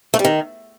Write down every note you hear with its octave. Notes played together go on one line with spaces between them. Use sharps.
A3
G3
D#3